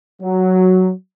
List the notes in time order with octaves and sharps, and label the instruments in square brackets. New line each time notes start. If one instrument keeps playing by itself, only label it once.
[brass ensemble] F#3